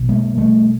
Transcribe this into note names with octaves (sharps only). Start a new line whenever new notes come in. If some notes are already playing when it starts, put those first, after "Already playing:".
Already playing: B1 B2
G#3 A#3
G3 A3